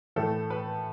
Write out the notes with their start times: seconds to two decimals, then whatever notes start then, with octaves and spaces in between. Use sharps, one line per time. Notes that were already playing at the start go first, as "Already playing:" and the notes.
0.16 A2 E3 A3 A4
0.50 B4